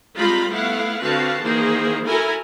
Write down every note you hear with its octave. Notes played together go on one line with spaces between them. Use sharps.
G3 G#3 C4 F4 A#5 B5
A3 B3 E4 F5 F#5
D3 C4 F#4 B4 F5 A5
D#3 E3 A#3 G#4 C5
E4 F#4 A4 A#4 G#5 A#5